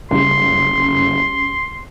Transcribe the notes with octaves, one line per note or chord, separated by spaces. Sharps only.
F#1 C#3 G3 C6